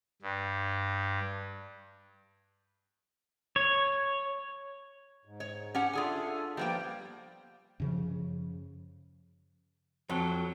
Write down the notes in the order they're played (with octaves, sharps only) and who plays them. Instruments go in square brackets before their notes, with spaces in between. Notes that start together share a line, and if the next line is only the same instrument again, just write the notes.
[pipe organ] G2
[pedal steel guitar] C#5
[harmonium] G#2
[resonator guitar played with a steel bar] C#5
C#4 G4 F#5
[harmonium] D4 A4 E5 [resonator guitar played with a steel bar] F4 G#4 G#5
[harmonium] F3 B3 [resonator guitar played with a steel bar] G3 A#3 G5
[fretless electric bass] F#2 C#3 F3
[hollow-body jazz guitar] F2 [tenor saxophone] F#3